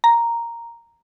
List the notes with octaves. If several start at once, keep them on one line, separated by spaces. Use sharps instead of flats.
A#5